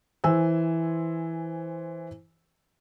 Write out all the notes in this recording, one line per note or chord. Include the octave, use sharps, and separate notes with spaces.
E3 C5 G#5 E6